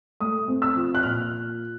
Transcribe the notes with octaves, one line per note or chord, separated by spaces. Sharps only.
A3 D#6
C4
E6
F3
F#6
A#2 F6